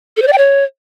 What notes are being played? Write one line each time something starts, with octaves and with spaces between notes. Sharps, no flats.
A4
C5
D5
G5
C#5